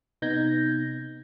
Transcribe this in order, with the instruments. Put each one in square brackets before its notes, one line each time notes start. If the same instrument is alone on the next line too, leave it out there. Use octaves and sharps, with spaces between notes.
[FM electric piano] C3 B3 D#4 G6 G#6 A#6